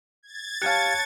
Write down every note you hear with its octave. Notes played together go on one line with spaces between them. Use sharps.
G#6 A6
G4 C#5 F5 A5 F#6 C#7